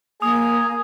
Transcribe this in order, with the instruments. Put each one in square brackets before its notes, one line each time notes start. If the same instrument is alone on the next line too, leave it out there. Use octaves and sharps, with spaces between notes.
[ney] A#3 [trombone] G#4 [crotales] D#6